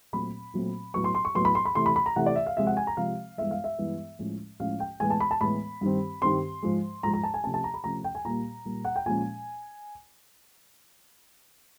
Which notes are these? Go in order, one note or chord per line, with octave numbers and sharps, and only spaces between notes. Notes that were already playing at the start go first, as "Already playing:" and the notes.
A#2 F#3 A3 C4 B5
A#2 F#3 A3 C4
A2 F#3 B3 C#6
C6
C6
C#6
A2 F#3 B3 C6
B5
C6
B5
C3 E3 A3 C6
B5
B5
A#5
C3 E3 A3 F#5
D5
E5
F5
C3 F3 G#3 C4 E5
F#5
G#5
A#5
C3 F3 G#3 C4 F5
G2 E3 G#3 B3 E5
F5
E5
G2 E3 G#3 B3
A2 F3 G#3 C#4
A2 F3 G#3 C#4 F5
G5
A2 E3 G#3 B3 G#5
A5
B5
A5
A2 E3 G#3 B3 B5
G2 D#3 G3 C4
G2 D#3 G3 C4 C6
G#2 F3 G#3
G#2 F3 G#3 A#5
A#5
A5
G#5
C3 F3 A3 C#4 A5
A5
A#5
B5
C3 F3 A3 C#4 A#5
G5
G#5
A#2 G3 A#3 A#5
A#2 G3 A#3
F#5
G5
A#2 F3 G#3 C#4 G#5